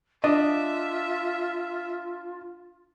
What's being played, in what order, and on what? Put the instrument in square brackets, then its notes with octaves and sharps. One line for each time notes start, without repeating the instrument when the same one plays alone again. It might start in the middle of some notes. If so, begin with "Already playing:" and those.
[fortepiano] D4 [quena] F4 [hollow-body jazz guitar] D#5 [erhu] E5